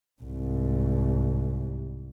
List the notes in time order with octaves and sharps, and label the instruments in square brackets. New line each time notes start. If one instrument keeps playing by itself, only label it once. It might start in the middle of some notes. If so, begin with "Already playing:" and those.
[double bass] C2 G#2